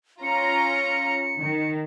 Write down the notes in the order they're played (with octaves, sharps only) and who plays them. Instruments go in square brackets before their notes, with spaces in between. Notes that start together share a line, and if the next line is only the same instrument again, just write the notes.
[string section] C#4 F4 A#5 [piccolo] C#7
[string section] D#3